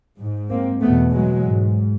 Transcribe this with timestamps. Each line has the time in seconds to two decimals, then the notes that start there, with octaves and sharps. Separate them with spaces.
0.19 G#2
0.50 A#3 C4
0.81 E2 B2 A3 B3
1.12 F#3 G#3
1.44 G#2